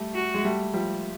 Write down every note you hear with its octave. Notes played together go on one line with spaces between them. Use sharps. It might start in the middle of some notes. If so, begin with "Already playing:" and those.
Already playing: G3 A3
F#4
G#3
G3 A3
F3 G3